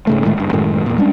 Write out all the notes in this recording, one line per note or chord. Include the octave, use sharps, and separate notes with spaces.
G#2 C#3 A3
A2 D#3 G#3 A3
F#1 G2
F#2 A2 D#3 G#3
E2 A#2
G3 G#3 C#4 D4